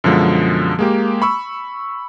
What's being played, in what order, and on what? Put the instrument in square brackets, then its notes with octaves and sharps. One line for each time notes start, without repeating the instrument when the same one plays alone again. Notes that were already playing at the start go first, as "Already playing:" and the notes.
[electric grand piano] F#2 B2 D3 F3 G#3
G#3 A#3 G4
B5 C#6 E6